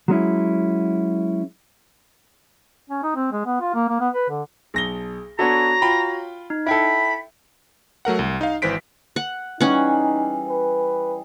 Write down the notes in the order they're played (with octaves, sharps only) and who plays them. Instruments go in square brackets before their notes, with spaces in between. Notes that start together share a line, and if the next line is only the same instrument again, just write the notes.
[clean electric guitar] F#3 G#3 C#4 E4
[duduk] C#4
D#4
C4
G#3
B3
F4
A#3
A#3
B3
B4
D3
[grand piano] B1 A#6 G7 [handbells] G#4
[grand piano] B3 D4 A4 [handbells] F#4 C#5 [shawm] A#5
[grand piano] F4 G5 B5
[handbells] D#4
[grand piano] E4 A4 [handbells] E5 G5 [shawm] B5
[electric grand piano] F#3 A3 A#4 F#5
C2
D#4 F5
G#1 E3 B4 C5 B6 D7
[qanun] F#5
[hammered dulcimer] E3 G3 G#4 [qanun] C#4 F#5 [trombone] D#4
[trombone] B4